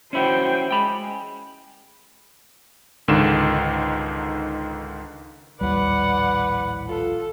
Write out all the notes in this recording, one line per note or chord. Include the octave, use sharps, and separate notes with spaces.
C#4 E4 F#4 C5 G5
G#3 G5 B5
C#2 G#2 D3 D#3 E7
A#1 D#2 A2 G3 B4 D5 F#5
F4 A4